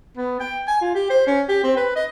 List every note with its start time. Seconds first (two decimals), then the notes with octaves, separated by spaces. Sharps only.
0.17 B3
0.40 G5
0.67 G#5
0.81 F4
0.95 G4
1.10 C5
1.27 C#4
1.48 G4
1.63 C4
1.76 B4
1.96 D#5